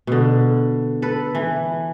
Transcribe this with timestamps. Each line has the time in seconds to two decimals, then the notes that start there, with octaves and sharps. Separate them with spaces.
0.07 B2 D3
1.02 A4 B4
1.35 E3